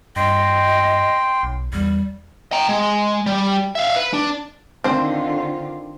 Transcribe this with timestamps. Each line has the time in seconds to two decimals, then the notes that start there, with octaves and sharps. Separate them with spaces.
0.16 G2 D#5 G5 C6
1.43 B1
1.73 E2 G3
2.52 G5 A#5
2.69 G#3
3.26 G3
3.75 E5 F5
3.96 B4
4.13 D4
4.84 D3 D#3 C4 F4 C5